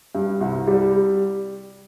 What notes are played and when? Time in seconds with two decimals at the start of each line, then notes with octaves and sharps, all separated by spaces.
0.15 G2
0.41 C2
0.67 G3